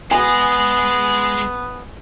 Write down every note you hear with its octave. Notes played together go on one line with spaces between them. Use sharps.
G#3 B3 D#5 G#5